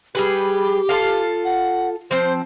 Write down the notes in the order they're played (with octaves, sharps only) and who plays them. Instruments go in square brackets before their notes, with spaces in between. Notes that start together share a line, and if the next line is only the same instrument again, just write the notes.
[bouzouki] G3 G#4 B4 [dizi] G4
[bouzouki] F4 A4 F5
[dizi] F#5
[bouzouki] F3 C4 [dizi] C5